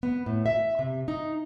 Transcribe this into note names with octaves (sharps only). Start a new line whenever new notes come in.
B3
A2
E5
C3
D#4